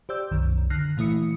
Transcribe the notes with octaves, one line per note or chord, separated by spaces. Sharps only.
G4 C5 D5 E6 G6
C2 F#2 D#3
D3 F6 F#6 A#6 C7
A#2 E3 A3 E4 D#6 C#7